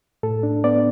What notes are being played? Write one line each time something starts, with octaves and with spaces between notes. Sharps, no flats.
A2 A4
D4
B3 D5